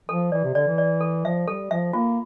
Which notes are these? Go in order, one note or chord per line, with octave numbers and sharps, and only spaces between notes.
F3 A4
E3 D5
C3
D3 D5
E3
D5
A4
F3 E5
G3 A4
F3 E5
A#3 F4